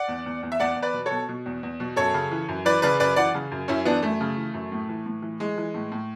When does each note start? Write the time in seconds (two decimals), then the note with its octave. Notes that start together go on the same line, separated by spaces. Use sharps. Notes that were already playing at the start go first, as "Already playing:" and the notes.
Already playing: D5 F#5
0.08 E2
0.26 E2
0.43 E2
0.52 E5
0.60 E2 D5 F#5
0.76 E2
0.82 B4 D5
0.94 B2
1.06 A4 C#5
1.11 B2
1.29 B2
1.46 E2
1.63 E2
1.80 B2
1.96 F#2 A4 C#5
2.14 C#3
2.31 E3
2.48 F#2
2.65 E3 B4 D5
2.82 C#3 B4 D5
3.00 F#2 B4 D5
3.16 E3 D5 F#5
3.34 C#3
3.51 F#2
3.68 F#2 C#4 E4
3.85 E3 B3 D4
4.02 F#2 A3
4.21 C#3
4.37 E3
4.54 F#2
4.72 A2
4.89 E3
5.06 A2
5.22 E3
5.40 E3 G#3
5.58 E3
5.74 A2
5.92 A2